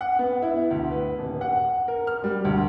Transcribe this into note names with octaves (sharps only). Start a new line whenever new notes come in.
F#5
B3
E4
D2
B4
D#1
F#5
A#4
F6
G3
D2